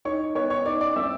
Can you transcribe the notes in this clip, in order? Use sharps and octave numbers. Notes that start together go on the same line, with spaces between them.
D#4 C#5 C#6
B3 C#5 C#6
C#5 C#6
D#4 D5 D6
D5 D6
C4 E5 E6